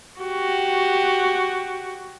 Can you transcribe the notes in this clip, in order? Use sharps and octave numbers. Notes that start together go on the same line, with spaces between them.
F#4 G4